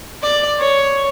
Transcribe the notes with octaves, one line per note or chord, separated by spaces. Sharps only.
D5
C#5